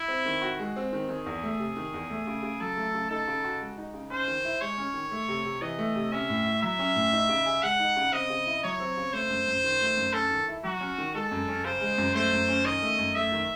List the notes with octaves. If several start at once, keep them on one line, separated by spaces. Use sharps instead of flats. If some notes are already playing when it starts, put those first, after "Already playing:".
Already playing: E4
C4
D#3
F#4
G#3
C4
D#3
D#3 G#4
E2
A3
C3
D#3
E2
A3
C#3
C#3
F#3 A4
A3
C#3
D#4 A4
C#3
F#4
G#3
D#4
C#3
C#4 C5
D#3
E4
G#3 C#5
C#4
D#3
A3
C3
C3
E3 D#5
A3
C3
C#4 E5
A2
E4
F#3 E5
C#4
A2
D#4
C#3
G#4
G#3 F#5
D#4
C#3
C4 D#5
C#3
E4
F#3 C#5
C4
C#3
A3 C5
F#2
F#2
D#3
A3
F#2
C#4 A4
D#3
E4
F#3 F#4
C#4
D#3
G#3 A4
F#2
C#4
C#3 C5
G#3
F#2
A3 C5
F#2
C#4
D#3 D#5
A3
F#2
A3 E5
D#3